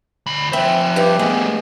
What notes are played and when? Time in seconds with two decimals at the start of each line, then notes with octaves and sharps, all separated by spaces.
0.26 D2 B5
0.53 F3 C4 E5
0.96 G2 G4
1.19 G#3 A3 B3